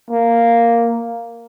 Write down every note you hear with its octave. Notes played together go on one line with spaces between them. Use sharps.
A#3